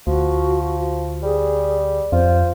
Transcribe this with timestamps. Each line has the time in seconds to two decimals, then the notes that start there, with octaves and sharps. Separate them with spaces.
0.07 D2 F3 F#4
1.23 G3 G#4
2.12 F2 F4 C5